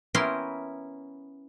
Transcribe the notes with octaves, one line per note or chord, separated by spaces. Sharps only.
B3 C#4 E4 A#4 G5 C6